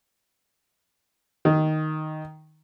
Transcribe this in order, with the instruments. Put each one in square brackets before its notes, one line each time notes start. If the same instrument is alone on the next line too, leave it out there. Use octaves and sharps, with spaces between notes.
[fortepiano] D#3